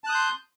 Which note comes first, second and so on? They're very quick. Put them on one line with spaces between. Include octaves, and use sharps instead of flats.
A5 F#6 D#6 G6 C6